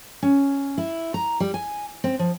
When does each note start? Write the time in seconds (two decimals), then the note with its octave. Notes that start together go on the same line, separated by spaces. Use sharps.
0.23 C#4
0.78 E4
1.14 A#5
1.40 G3
1.54 G#5
2.04 C4
2.19 F3